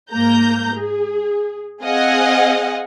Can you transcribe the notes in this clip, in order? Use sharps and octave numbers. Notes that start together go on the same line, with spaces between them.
G#2 A#3 A#5 G6
G#4
C4 G#4 D#5 F5 F#5 G#5